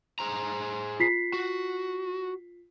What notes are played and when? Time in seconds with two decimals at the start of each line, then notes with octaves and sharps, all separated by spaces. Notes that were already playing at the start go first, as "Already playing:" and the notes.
0.19 G#4 C5 A#5
1.00 F4 B6 C7
1.34 F#4